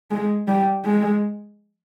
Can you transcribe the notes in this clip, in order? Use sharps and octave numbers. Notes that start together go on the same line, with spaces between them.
G#3
G3
G#3